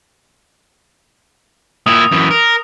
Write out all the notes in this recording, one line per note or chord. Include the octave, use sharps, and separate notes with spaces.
A#2 E4 D#6
F#2 E3
A#4